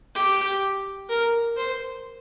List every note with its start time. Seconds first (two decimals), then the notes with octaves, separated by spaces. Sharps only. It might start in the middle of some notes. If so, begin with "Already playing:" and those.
0.15 G4
1.09 A#4
1.57 C5